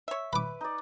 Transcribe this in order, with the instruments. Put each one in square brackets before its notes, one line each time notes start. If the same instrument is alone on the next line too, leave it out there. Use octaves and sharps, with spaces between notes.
[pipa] C#5 E5
[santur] B4 [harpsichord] B5 D6
[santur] D#4 D5